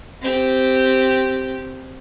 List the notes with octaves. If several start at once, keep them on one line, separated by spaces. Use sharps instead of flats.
C4 G4